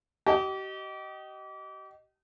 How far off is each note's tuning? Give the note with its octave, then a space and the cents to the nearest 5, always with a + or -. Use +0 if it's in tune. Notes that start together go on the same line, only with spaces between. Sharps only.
G4 -35 D#5 +0